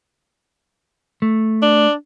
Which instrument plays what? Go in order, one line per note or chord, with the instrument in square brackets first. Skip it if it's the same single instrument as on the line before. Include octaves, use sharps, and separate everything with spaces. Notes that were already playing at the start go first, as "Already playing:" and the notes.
[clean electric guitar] A3
[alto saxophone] D4